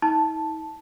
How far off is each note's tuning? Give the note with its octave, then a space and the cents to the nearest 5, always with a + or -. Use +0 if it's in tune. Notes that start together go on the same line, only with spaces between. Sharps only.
D#4 +45 A5 +0